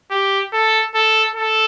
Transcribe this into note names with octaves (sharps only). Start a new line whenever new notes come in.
G4
A4
A4
A4